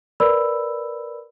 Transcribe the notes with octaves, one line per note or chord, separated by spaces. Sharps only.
A#4 B4 D5 B5 E6